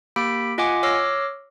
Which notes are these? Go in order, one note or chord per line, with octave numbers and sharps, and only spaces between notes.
A#3 G4 B5 B6 D7
F4 D#5 F#5 G#5 D6
C#5 D6 E6 F6 A#6 C7